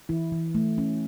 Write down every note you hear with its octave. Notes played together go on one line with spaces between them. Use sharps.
E3 E4
E3
A3
C#4